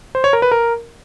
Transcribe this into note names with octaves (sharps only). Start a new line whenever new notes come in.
C5
C#5
A#4
B4
A#4